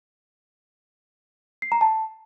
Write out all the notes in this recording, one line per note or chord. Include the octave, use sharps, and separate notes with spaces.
C7
A#5
A5